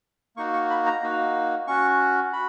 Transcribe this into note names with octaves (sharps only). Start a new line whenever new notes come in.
A#3 D#4 F#4 C#6
C#6
B5
A#5
A#3 D#4 F#4
C#4 F#4 C#6
F#4 B5